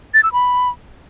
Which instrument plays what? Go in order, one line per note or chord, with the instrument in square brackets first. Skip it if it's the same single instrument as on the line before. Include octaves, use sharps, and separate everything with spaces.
[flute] A6
E6
B5